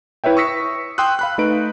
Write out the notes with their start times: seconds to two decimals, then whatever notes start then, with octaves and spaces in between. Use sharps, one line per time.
0.24 E4 B4 C#5 E5 G5
0.37 C#6 D#6 E6 A#6 B6 C#7
0.98 G5 C6 D#6 E6 F#6
1.19 F5 B5 F#6
1.38 A3 D#4 B4 D7